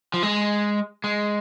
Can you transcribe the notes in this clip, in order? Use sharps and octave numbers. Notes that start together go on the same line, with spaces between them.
F3
G#3
G#3